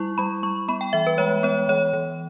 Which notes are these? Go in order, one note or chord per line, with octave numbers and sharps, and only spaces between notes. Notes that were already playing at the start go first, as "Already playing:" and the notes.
Already playing: G3 E4 C#6
G3 B5
G3 C#6
B3 B5
G5
E3 E5
B4
G#3 C#5
B3 C#5
E3 C#5
E3